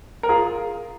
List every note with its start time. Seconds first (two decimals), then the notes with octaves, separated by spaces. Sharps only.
0.23 A#4
0.29 F4 G#4